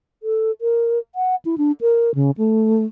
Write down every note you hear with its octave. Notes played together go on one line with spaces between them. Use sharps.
A4
A#4
F#5
E4
D4
A#4
C#3
A3